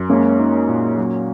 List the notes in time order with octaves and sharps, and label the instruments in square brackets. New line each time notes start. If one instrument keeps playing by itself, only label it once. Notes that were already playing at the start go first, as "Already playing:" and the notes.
Already playing: [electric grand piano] F#2
[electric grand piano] G#3 [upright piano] A#3 C#4
[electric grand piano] D#4
A#2
F#3